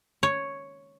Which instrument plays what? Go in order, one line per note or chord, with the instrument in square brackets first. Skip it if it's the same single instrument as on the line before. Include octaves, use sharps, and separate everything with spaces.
[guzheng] C#5